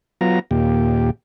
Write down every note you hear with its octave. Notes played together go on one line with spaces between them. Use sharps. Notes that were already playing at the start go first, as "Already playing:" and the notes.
F#3 B3 F4 A#5
D#2 A#2 G4